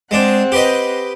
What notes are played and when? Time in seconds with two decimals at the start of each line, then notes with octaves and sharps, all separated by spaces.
0.11 G#3 C4 D4 F#5
0.52 G4 B4 D#5